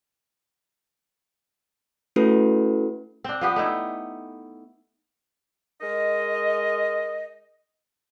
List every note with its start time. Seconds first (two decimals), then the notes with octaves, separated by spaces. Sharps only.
2.16 A3 C#4 E4 F#4 A4 B4
3.24 C4 D4
3.41 F3 B3 G4
3.56 A3 D#4 E4
5.82 G#3 A#4 D#5